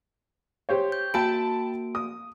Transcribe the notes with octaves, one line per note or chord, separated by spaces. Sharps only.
G4 C5 C#5
G6
A#3 F#4 G5 A5 B5 D7
D#6